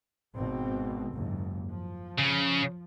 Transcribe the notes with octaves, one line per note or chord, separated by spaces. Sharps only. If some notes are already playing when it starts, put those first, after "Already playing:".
G#1 B2 C4
F#1 D#2 G#2
F3
C#3